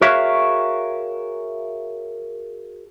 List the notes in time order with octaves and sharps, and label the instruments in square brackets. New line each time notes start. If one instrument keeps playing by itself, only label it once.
[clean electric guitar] F#4 G#4 A#4 C#5 E5 F5